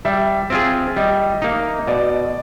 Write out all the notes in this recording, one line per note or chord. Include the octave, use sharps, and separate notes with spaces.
G3 E5
C4 F4 G#4
G3 D#5
A#3 D#4
B2 D5